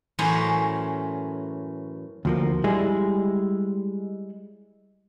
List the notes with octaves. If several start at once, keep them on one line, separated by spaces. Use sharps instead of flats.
F#2 A2 E3 C#4 C5 A#5
D2 F3 A#3
G3 G#3 E4 G#4